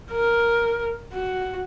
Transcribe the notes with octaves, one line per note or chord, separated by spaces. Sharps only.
A#4
F#4